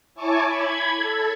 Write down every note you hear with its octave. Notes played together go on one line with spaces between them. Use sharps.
E4 C#5 G#5 A5 C#6 D6
B5 G#6
A4